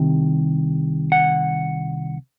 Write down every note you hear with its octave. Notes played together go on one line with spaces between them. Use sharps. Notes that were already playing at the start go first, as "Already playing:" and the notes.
Already playing: C2 C3 D#3
F#5